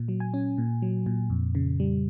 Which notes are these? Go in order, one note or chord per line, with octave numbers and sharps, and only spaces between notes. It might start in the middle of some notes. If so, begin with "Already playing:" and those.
Already playing: A#2
F#3
G#5
C#4
A#2
F#3
A#2
F2
C#3
G3